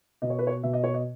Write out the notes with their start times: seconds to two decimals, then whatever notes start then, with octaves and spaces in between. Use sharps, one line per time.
0.22 B2 D#5
0.30 C#5
0.39 B4
0.47 C#5
0.63 B2 E5
0.73 D#5
0.84 C#5
0.94 D#5